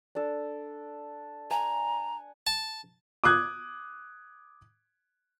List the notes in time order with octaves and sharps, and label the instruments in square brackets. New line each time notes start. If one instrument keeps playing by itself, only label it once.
[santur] D4 A4
[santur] F#5 G#5 [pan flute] A#5
[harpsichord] A5
[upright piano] D6 D#6 F#6 G#6